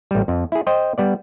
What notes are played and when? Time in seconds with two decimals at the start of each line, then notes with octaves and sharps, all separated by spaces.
0.11 A1 G3
0.28 F2
0.52 E4 G#4
0.67 C5 D#5 G5
0.98 G3 B3 D5